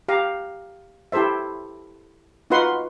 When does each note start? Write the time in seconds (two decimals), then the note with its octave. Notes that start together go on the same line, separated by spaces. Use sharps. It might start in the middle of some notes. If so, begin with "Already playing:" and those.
0.08 G4 F5 A#5
1.12 E4 G4 A4 C5 E5
2.50 D#4 F4 F#4 B4 F#5 C6